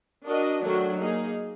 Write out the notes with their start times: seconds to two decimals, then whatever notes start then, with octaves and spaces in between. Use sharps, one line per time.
0.26 D4 F#4 A#4 D#5
0.63 D#3 F#3 A3 D4 F#4
0.99 A#3 D#4 G#4